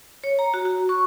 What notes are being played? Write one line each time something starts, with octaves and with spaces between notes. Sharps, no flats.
C#5
A#5
F#4
F#4
C#6